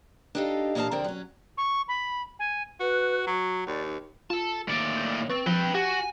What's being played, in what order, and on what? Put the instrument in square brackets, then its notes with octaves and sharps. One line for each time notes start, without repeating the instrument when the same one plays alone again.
[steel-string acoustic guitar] D4 D#4 G4 A4 D#5 F5
A#2 E3 D#4 F#4 F5 A5
F2 D3 C4 A#4 D5 G5
F#3 C#4
[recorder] C#6
B5
G#5
[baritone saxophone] F#4 [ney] B4
[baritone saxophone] F#3 [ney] C#6
[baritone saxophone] D#2 [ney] D5
[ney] D#4
[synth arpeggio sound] F4 [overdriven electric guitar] A4 A5
[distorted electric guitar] A2 D5 [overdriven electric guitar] D#3 A#3
[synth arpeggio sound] G6 D#7
[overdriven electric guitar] C4 [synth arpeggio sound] B4 C#6 A6
[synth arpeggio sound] F3 [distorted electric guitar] B4 G5
[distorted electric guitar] F#4 [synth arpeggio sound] G4 [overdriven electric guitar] G#5